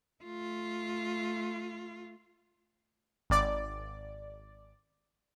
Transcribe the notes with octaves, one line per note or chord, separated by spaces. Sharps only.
A3 F4
G#1 D5